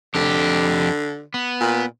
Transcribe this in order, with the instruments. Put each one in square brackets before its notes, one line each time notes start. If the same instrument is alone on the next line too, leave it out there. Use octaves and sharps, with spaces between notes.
[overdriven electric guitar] F2 G4 [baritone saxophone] D3
[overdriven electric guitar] B3
[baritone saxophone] A#2